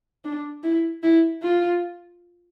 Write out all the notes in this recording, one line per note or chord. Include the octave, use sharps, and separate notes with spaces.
D4
E4
E4
F4